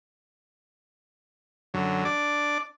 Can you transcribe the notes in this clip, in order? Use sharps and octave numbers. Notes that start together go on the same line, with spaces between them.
F#2 D3 F#3
D4 D5 D6